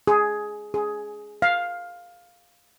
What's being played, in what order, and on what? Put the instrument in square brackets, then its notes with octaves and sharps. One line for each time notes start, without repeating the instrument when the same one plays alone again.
[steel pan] G#4
G#4
F5